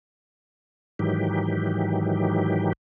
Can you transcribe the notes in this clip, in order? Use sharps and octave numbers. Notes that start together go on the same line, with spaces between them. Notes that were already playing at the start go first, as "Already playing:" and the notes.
G#2 D#3 E3 F#3 G4